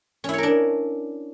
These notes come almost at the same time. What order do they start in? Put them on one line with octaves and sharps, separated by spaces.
C#4 E4 C#5 A#4 D4